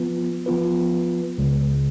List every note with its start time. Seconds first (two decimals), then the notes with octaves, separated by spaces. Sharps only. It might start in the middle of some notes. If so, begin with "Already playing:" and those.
Already playing: F3 B3 F4 B4
0.46 F3 B3 F4 B4
1.38 C#2 C#3 G#3